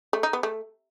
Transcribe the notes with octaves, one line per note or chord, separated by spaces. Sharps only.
A3
D#4
B3
A3